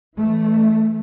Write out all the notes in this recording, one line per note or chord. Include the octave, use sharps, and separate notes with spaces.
E3 A3